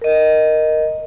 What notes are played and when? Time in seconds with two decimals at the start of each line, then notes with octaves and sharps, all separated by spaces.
0.02 A#4 D#5